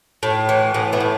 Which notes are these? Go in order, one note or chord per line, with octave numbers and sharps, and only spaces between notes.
A2
E3
A2 B3
B3 E4
A2